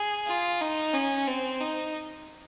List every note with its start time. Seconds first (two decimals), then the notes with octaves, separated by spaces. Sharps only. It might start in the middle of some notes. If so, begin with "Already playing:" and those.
Already playing: G#4
0.27 F4
0.61 D#4
0.94 C#4
1.27 C4
1.61 D#4